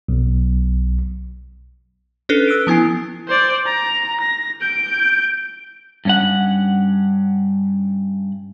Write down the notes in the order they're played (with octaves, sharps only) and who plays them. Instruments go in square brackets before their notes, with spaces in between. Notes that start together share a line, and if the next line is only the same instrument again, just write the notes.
[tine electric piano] B1
[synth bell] C#4 D4 A4 B4
E6 F#6 D7
F3 B3 E4 G#5 C7
[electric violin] C5 D5
A#5
A#6
G6 D7
[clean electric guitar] G2 C#4 F#5